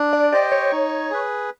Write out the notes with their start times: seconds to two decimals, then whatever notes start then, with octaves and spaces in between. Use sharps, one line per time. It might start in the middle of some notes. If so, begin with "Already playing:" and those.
Already playing: D4
0.13 D5
0.32 G4 C5 D5 D#5 G5
0.52 C#5
0.72 D#4
1.11 G#4 B4